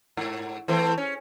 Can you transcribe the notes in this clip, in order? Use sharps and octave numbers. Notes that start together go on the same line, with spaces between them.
G#2
E3 A3 C4
C#4